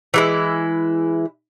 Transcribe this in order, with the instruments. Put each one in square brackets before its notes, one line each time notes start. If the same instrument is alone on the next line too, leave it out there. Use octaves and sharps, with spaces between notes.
[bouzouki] E3 G#3 E4